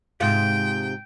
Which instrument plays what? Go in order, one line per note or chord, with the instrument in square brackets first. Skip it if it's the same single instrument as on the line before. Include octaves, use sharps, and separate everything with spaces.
[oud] G#2 C3 F4 [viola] G5